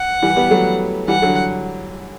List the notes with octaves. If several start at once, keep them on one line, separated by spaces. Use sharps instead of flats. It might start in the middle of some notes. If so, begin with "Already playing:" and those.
Already playing: F#5
E3 G3
G3 B3
F#3 A3
E3 G3 F#5
D3 F#3